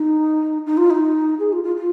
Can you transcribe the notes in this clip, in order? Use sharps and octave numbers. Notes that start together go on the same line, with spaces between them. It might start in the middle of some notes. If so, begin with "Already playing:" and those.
Already playing: D#4
D#4
F4
D#4
G#4
F4
F4
F4